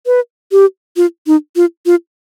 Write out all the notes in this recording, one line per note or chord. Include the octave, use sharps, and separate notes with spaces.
B4
G4
F4
D#4
F4
F4